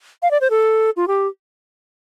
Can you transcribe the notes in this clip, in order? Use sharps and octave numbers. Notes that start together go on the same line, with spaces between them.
F5
D5
C5
A4
F4
G4